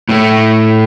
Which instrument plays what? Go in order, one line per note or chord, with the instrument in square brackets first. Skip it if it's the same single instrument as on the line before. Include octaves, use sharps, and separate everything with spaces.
[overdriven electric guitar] A2 A3